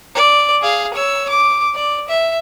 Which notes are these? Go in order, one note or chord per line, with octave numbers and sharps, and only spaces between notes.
D5
G#4 F5
C#5 E6
D6
D5
E5